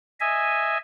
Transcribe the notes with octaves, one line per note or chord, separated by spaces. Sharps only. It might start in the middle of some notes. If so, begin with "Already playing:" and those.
D#5 E5 G#5